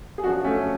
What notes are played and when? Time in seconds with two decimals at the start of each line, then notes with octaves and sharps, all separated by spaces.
0.18 G#4
0.24 F#2 D4 F#4
0.27 F3
0.44 A3 C#4